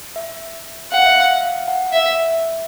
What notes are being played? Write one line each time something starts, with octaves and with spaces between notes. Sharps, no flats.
E5
F5 F#5
E5
F5
F5
F#5
E5